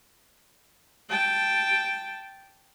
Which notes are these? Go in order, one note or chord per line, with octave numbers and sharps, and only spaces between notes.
G5 A5